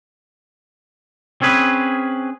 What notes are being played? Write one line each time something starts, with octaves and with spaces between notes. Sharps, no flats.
C4 C#4 G#4 B4